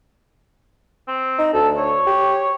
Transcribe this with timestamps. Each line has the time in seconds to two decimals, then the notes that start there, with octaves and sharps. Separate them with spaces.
1.07 C4
1.38 D#4
1.53 D2 A4
1.77 C#5
2.07 G4